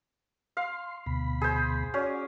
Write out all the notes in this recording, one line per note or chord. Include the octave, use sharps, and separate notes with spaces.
F5 C6
D2 B2 B5
G#4 C5
C#4 F#4 D5